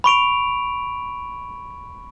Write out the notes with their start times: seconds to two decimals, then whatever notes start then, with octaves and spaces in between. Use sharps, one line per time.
0.04 B5 C#6 D7 F7